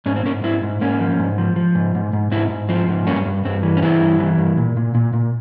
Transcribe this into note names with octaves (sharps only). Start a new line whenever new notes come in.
G#2 C#4
C4
G#2 A#3 C#4
G#2 C4 E4
G#2
G#2 A#3 C#4
F3
G#2
F3
F3
G#2
G#2
G#2
G#2 C4 E4
G#2
F3 C4
G#2
G2 A#3 C#4
G2
G2 C4
E3
C#4
E3 C4 E4
G2
E3
G2
A#2
A#2
A#2
A#2